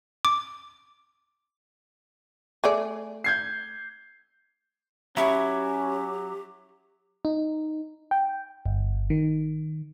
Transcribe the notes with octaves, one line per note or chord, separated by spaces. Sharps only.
D6
A3 G#4 D5
G6 G#6 C7
F#3 C#4 E4 G4 C#6 D#6
D#4
G5
G1
D#3